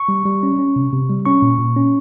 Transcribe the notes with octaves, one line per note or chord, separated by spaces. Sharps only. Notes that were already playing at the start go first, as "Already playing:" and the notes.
Already playing: C#6
G3
G3
C#4
C#4
C3
C3
G3
C#4 C#6
A#2
A#2
C#4